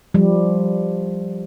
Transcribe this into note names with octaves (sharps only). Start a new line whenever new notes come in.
F3 G3